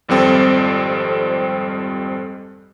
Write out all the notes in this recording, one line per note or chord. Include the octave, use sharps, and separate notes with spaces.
G#1 F2 G3 C4 A4